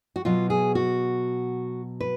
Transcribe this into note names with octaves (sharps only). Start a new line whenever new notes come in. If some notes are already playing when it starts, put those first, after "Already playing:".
F#4
B2 F#3 F4
G#4
F#4
B4